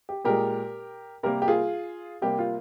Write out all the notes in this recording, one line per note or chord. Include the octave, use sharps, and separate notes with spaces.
G4
A#2 G#3 G4 A#4
C3 G3 A#3 G4 A#4
G4
F4 G#4
C3 G3 A#3 G4
F4